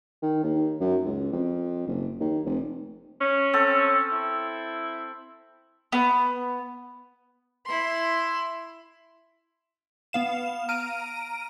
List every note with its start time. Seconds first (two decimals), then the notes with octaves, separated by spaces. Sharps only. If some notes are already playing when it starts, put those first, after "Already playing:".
0.22 D#3
0.43 D#2
0.81 F#2
1.05 C#2
1.32 F2
1.87 F#1
2.20 D#2
2.45 F1
3.21 C#4
3.53 C4 A4
4.12 E4
5.92 B3
7.66 E4 C6
10.13 B3 F5 E7
10.69 A#5 F6 D7 D#7